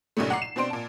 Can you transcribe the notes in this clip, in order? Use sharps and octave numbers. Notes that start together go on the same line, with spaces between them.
B1 G2 A#2 C#3 A3
F#5 A#5 D6 C7
E7
B2 C4 D4 C5 C6 D7
A#2 A5